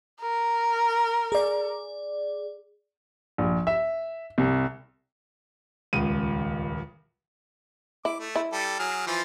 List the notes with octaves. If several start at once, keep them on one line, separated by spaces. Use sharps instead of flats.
A#4
G#4 D5
A#1
E5
C2
D#1 C#2 D#7
E4 D6
A3
E4
G3 A4
F#3 G#4 F6
E3 F3 F4